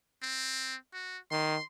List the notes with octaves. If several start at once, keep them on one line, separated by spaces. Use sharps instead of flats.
C4
F#4
D#3 C6